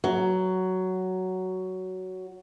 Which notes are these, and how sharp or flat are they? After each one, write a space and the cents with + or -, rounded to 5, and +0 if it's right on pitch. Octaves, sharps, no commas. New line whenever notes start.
F#3 +10